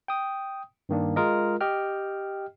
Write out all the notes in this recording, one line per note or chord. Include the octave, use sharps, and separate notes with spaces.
G5 D#6
G2 D#3 A#3 D4
G#3 F4 A#4 D#5
G4 D#5 G5 F6